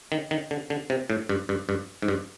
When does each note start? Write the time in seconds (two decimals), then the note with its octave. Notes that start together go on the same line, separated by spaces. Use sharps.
0.12 D#3
0.31 D#3
0.51 D3
0.70 D3
0.90 C3
1.10 A2
1.29 G2
1.49 G2
1.69 G2
2.02 G#2
2.08 G2